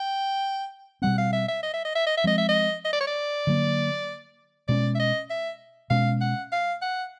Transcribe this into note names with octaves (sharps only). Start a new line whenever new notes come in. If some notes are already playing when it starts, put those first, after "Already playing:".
Already playing: G5
B2 G3 C4 F#5
F5
E5
E5
D#5
E5
D#5
E5
D#5
E5
F3 G#3 C4 D#5
E5
D#5
D#5
D5
C#5
D5
D3 F#3 A#3
B2 G#3 C#4 D5
E5
D#5
E5
B2 G#3 C#4 F5
F#5
F5
F#5